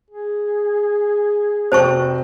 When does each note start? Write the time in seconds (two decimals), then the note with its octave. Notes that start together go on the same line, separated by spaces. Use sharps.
0.11 G#4
1.72 F1 C4 F#4 C5 A5 C#6